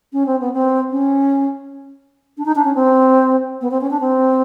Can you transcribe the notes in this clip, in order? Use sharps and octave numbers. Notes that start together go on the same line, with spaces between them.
C#4
C4
B3
C4
C#4
D4
D#4
D4
C#4
C4
B3
C4
C#4
D4
C4